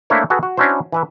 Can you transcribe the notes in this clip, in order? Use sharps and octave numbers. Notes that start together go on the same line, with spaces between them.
A3 A#3 D4 E4 C5 C#5
F#4 G#4 A4 B4 F#5 G#5
F#4
C#4 D4 E4 F#4 C5
E3 B4 E5